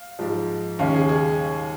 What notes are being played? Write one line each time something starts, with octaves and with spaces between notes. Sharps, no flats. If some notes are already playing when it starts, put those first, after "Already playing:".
Already playing: F5
G#2 F3 G#3
D#2 C#3 G#3 C#4 F5
G#4
G#4